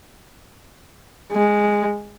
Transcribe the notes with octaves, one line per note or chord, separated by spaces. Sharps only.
G#3